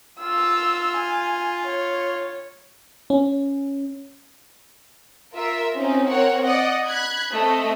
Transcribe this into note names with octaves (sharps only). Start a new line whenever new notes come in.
F4 E6
G#5
C#5
C#4
F4 A#4 E5
C4 C#4 D#4
C4 A#4 C#5 F#5
D5 D#5 F#5
B5 F#6 G#6
A3 C4 D#5